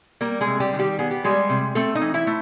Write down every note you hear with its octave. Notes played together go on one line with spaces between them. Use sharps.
G3 A#3 A#4
G#3 G#4
C3
G3 G4
D#3
G3 G4
B3 G#4
G4
G3 G#3 G#4
C3
A3 C4 A4
D#4 D#5
E3
E4 E5
A3